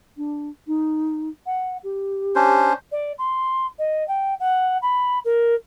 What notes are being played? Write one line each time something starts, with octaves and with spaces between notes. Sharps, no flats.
D4
D#4
F#5
G4
C#4 D4 C5
D5
C6
D#5
G5
F#5
B5
A#4